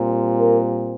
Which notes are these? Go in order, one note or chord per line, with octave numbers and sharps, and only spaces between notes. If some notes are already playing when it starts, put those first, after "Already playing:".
Already playing: A#2 G3 C4
A#4